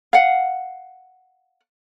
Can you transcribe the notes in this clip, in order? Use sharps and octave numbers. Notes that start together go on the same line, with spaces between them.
F5 F#5